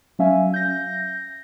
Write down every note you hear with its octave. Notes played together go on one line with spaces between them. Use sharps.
F#3 C#4 E5 F5 G#5
G6 A#6